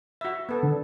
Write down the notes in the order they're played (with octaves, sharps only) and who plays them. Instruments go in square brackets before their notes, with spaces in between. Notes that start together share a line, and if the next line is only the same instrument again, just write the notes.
[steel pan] F#4 E5
B3 A4
[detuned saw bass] D3